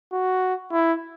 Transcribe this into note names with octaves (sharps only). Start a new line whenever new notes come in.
F#4
E4